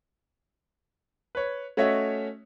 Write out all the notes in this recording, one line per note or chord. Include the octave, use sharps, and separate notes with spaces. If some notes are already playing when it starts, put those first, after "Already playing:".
B4 C#5
A3 C#4 F#4 C#5 D#5 E5